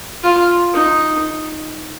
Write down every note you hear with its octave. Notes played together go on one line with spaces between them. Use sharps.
F4
D#4